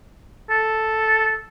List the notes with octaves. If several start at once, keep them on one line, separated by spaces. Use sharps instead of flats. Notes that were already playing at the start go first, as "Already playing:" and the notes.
A4